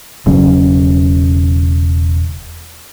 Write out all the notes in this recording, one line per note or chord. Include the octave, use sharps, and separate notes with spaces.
E1 C#3 F#3 C#4